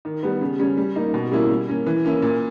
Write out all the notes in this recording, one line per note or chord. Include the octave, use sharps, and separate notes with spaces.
D#3
G3 B3
C#3
G3 C#4
G3
A#3 D#4
B2
G3 A#3 C#4 E4
G3
A#3 C#4
E3
A#3 C#4 E4
A#2